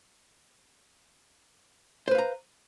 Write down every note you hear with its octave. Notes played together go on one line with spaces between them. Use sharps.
B4 C5 F5 A#5